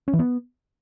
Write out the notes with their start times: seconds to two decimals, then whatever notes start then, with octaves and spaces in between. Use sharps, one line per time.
0.08 C#4
0.13 E3
0.19 B3